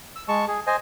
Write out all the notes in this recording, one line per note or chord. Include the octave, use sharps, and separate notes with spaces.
E6
G#3 A5 C#6
G#4
C5 D#5 G#5